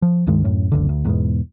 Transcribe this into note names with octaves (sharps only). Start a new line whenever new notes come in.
F3
C#2 G2 D#3 G#3
D1 F#2 A2 C#4
F#1 C#2 D3
D2
E2 G#2 B2